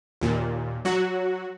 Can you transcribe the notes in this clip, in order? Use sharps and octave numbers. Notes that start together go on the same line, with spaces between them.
D#2 A#2
F#3 F#4